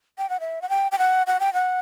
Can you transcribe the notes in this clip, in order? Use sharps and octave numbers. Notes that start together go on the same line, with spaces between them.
G5
F#5
E5
F#5
G5
G5
F#5
F#5
G5
F#5